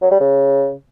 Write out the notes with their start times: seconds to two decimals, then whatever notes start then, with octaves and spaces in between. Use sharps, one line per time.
0.02 F#3
0.11 G3
0.20 C#3